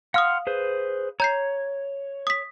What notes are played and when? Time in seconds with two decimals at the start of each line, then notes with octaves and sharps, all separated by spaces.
0.14 F5 F#5 C6 D#6 F6
0.47 G#4 B4 C5
1.20 C#5 A#5 G6 C7
2.27 D#6 B6